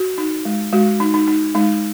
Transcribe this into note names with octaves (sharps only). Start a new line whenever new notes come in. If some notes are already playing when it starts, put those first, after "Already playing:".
Already playing: F#4
D#4
G#3
G#3 F#4
D#4
D#4
D#4
G#3 D#4